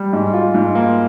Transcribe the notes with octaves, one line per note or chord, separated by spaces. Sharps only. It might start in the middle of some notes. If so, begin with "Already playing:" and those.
Already playing: G3
G#2
F4
G#2
A#3